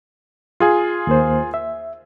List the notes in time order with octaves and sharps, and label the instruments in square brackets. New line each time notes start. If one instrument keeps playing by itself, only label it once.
[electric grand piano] F4 G#4 G#5
[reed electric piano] D#2 A#3 C5
E5